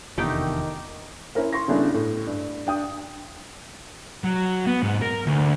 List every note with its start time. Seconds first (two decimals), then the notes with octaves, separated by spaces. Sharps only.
0.18 F1 E2 D3 D#3 A3 D#4 G4 G5
1.35 C#4 E4 A#4 C5
1.53 C6 C#6 A#6
1.68 C#3 G3 A3 B3 D4 E4
1.94 A2
2.27 G2
2.67 D4 G5 D#6
4.24 F#3
4.67 B3
4.82 G#2
5.02 A#4
5.26 D2